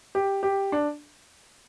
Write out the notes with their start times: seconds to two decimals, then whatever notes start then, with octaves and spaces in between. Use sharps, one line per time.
0.15 G4
0.43 G4
0.72 D4